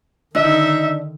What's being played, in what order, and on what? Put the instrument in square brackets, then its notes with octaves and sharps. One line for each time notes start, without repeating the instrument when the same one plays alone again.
[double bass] D3 D#3 [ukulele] D4 D#5 [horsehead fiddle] D#4 E5 [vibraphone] E6